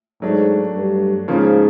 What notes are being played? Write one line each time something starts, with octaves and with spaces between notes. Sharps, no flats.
G#2 F#3 A3 D4
G2
G#2 C#3 F3 A#3 C#4 F4